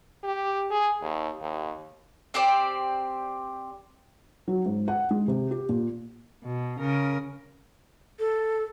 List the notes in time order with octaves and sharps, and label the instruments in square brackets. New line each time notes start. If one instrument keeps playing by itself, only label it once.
[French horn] G4
G#4
D#2
D#2
[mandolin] C4 G4 C5 D5
[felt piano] F#3
G#2
F#5
G#3
C3
G4
A#2
[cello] B2
C#3 A#4
[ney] A4